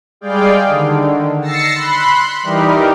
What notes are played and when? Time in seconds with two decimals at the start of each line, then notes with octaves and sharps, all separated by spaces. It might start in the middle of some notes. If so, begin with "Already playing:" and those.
0.21 G3 G#3 G#4 D5 F5 G5
0.67 D3 D#3
1.41 E6 A6 A#6 C7 C#7
1.75 B5 C6 F#6
2.43 E3 G3 D#4 G4 A#4